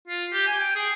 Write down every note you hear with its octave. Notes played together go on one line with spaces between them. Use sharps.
F4
G4
G#5
G5
G#4